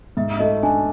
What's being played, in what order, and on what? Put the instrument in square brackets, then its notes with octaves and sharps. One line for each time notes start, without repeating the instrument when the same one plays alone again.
[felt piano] G#2 [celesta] E5
[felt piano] A3 [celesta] D#5
[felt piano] D4 [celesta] G#5